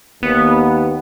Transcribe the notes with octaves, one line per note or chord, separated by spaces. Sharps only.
D#2 B3